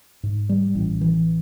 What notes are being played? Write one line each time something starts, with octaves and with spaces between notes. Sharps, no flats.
G#2
G3
A1
E3